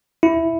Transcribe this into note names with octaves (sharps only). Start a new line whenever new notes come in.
E4